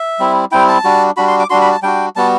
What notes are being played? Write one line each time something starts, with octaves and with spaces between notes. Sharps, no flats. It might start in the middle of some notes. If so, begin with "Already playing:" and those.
Already playing: E5
G3 C4 E4
G3 C4 E4 G5
A5
G3 D4 F#4
G3 D4 F#4 B5
C6
D6
G3 D4 F#4 C6
B5
A5
G3 D4 F#4 G5
G3 B3 F#4 A5